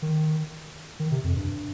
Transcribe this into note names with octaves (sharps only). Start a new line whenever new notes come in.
D#3
D#3
C3
F2
G2